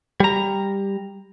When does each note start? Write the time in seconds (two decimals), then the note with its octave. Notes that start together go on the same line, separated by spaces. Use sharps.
0.20 G3 A#5